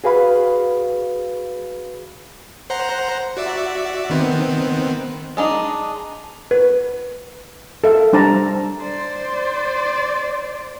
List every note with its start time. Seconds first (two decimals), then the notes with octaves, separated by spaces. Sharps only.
0.04 F#4 G#4 B4 F5 B5
2.70 C5 F#5 A#5
3.37 F#4 D5 E5
4.10 D#3 B3 C4
5.37 G#3 D4 D#4
6.51 B4
7.84 A4 E5 F5
8.13 G3 D4 C5 A5 A#5
8.81 C5 D5